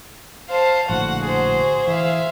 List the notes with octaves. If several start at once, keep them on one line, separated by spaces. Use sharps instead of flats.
C5 F5 A5
A#1 A2 D3 F#4 F#5
G#4 C5
E3 E5 F5